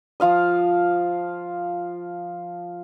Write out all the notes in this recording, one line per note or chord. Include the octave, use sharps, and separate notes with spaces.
F3 F4 F5 D#6